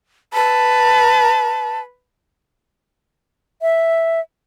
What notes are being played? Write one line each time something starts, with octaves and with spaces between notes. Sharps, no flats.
B4 A5
E5